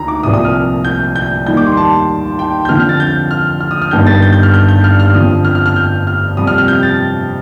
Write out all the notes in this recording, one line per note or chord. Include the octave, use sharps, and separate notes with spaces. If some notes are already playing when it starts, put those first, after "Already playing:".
Already playing: D2 D#3 A#5
D6
C2 A#2 F3 D#6
D#6
F6
G6
G6
D#2 D#3 G3 G6
D6
C6
A5
G5
G6
F2 D3 F3 F6
F6
A6
G6
F6
F6
D#6
F6
G1 G2 D#3 G3 G6
A6
G6
G6
F6
G6
G6
F6
F6
F2 D3 F3 D#6
F6
F6
F6
G6
F6
F2 C3 G3 D#6
F6
F6
G6
A6